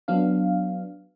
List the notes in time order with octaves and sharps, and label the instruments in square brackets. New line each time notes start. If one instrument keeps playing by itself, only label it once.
[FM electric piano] F#3 B3 D4 F5